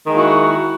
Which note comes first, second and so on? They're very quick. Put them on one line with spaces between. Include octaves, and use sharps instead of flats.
D#3 G#3 A#3 E4 F#4